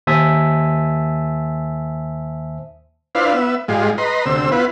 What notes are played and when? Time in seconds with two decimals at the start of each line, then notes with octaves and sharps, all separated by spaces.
0.07 D#2 C5 E5 G#5 A5 D#6
3.15 D4 E4 F4 B4 C5 F5
3.34 B3 E5
3.68 G#2 G3 G#3 F4
3.98 B4 D#5 A#5 C6
4.26 D2 C3 C4 E6
4.52 B3 E4 F4 B4